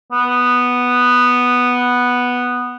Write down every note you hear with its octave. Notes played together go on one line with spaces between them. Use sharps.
B3